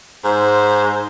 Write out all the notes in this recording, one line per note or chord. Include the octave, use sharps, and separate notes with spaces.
G#2 C5